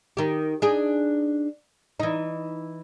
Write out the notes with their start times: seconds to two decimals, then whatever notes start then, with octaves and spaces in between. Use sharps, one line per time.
0.17 D#3 G4
0.62 D4 D#4 G#4
2.00 E3 D#4